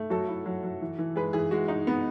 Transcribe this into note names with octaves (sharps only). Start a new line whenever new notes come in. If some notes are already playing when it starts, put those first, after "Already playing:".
Already playing: A3
F#3 F#4 A4
E4
F#3
F#3
E3
E3
G#3 G#4 B4
E3 G#4
G#3 F#4
D#4
B3